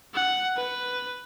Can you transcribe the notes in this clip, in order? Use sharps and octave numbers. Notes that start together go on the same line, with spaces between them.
F#5
B4